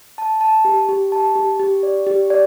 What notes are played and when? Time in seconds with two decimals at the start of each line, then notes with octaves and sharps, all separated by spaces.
0.18 A5
0.41 A5
0.65 G4
0.89 G4
1.12 A5
1.35 G4
1.60 G4
1.83 D5
2.07 G4
2.30 D5